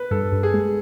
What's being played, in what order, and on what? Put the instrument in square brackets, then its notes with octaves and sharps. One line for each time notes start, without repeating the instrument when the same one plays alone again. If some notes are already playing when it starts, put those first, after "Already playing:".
Already playing: [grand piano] B4
[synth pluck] G2 [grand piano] A4
[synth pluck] G2
[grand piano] G#4
[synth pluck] G#3